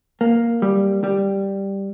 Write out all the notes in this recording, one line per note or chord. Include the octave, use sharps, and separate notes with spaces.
A#3
G3
G3